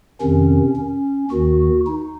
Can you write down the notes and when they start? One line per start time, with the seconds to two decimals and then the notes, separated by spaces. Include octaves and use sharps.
0.21 F2 C3 D#3 C#4
0.76 C#4
1.31 D#2 D#3 F#4
1.87 D#4